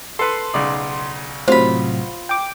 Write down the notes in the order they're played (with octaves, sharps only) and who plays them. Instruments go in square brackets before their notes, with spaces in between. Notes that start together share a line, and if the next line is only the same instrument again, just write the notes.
[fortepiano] A4 B4 [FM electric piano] C6
[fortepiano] B1 C#3 D5
[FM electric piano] A2 C3 F#3 [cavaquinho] F4 B5 [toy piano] C5
[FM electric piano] G5 D6